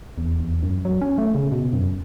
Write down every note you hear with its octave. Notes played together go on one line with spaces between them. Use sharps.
E2
E2
F#2
F#3
C#4
A3
C#3
B2
F#2